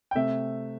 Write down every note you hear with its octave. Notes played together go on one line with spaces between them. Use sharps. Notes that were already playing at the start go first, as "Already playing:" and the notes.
G5
C3 A3 E5